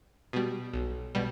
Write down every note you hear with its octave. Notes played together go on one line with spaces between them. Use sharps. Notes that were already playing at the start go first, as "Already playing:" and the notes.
B2 G3
B1
B2 G3